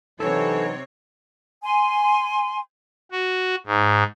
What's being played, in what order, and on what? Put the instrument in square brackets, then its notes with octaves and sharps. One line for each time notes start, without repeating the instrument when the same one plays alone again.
[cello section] C3 C4 C#5 [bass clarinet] E3 [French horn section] F#3 D4 D#4 [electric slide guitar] A4
[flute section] G#5 C6
[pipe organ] F#4
G#2